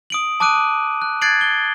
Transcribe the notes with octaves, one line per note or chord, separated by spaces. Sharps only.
D#6 D7 F#7
A5 D6 D#6 F#6 D7 D#7
F#6
F#6 G#6 A6 C7 D7 F#7
G7